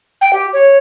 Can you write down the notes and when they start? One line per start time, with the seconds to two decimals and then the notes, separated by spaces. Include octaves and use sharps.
0.21 G5
0.33 G4
0.53 C#5